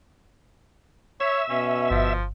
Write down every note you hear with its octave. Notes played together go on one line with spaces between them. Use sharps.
C#5 E5
B2 C#4
G1 F3